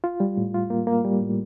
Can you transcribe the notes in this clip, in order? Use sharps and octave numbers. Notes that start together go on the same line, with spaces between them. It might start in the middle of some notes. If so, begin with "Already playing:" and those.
F4
G3
A2
F4
A#3
A#3
G3
A2